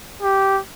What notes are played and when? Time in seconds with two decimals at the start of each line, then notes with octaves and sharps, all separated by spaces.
0.22 G4